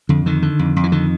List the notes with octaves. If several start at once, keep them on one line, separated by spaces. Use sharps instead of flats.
F2 D3
D3 D#3
D3
F2
F2
E3
D3 D#3